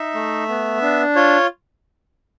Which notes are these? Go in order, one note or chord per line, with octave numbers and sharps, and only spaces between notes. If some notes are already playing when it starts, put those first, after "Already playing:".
Already playing: D#4 E5
A3
B3
D4
F4 C#5